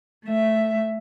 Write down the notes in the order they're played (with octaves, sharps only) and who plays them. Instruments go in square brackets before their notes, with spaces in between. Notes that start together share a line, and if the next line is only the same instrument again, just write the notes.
[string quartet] A3 E5